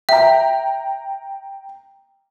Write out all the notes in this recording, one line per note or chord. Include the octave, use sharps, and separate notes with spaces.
E5 G5 A#5